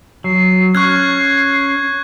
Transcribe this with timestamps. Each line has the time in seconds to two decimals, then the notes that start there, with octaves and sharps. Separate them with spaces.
0.24 F#3 C7
0.75 C#4 C#6 F6 F#6 G#6